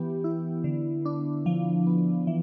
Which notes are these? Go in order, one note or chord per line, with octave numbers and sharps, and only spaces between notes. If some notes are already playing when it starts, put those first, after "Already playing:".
Already playing: E3 B3 G4
E4
D3
D4
F3
B3
E3